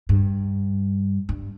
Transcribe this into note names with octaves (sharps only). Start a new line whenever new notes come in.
G2
G2